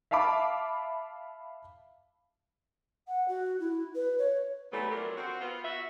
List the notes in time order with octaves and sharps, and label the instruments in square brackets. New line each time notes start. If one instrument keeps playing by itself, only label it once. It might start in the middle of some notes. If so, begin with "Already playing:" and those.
[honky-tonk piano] E5 F5 A5 B5 D6
[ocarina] F#5
F#4
E4
B4
C#5
[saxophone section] C3 E3 F#3 G3 A3 B3
F3 F#3 C4 D4 A#4
C4 F#4
B3 F4
F#4 E5